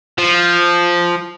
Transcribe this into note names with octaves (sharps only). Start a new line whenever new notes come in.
F3